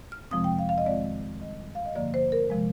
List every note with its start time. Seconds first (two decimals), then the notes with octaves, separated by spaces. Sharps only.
0.12 F6
0.31 F2 C3 F3 G#3 C4 D#6
0.44 G5
0.59 F5
0.69 F5
0.78 D#5
0.86 F2 D#3 G#3 C4 D5
1.41 D#2 D#3 G3 D#5
1.75 F5
1.86 D#5
1.95 G2 D3 F3 A#3 D5
2.14 C5
2.32 A#4
2.50 C3 F3 G#3